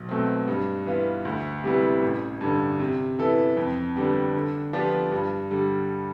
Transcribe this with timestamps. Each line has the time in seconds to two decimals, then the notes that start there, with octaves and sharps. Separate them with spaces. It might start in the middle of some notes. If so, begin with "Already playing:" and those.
Already playing: B1
0.09 B2 A3 C4
0.48 G2
0.86 E3 B3 F4
1.25 D2
1.64 C3 G3 B3 E4
2.02 A1
2.41 G2 D3
2.80 C3
3.19 E3 B3 E4 A4
3.57 F2
3.96 D3 G3 B3
4.34 D3
4.73 F3 B3 D4 G4
5.11 G2
5.51 D3 G3